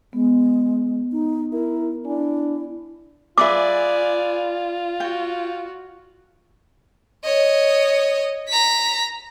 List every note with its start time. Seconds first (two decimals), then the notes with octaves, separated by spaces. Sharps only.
0.13 G#3 B3
1.12 D#4
1.53 E4 A#4
2.05 D4 E4 G#5
3.38 F4 G#4 B4 D5 E5 G#5 D6
5.00 F#4 G5
7.24 C#5 D#5
8.49 A#5 B6